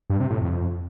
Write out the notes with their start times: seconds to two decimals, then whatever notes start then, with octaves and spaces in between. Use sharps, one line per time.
0.10 G2
0.20 C3
0.30 A2
0.41 F2